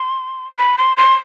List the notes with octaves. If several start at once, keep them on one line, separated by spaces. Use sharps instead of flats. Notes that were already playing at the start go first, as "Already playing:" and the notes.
Already playing: C6
B5
C6
C6